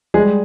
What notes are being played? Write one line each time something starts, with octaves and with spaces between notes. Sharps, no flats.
G3 G#3 G#4